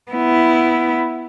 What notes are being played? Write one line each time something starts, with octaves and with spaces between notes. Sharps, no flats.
B3 E4